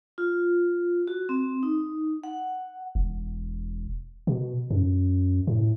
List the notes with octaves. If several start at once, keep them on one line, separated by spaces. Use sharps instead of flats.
F4
F#4
C4
D#4
F#5
E1
B2
F#2
A2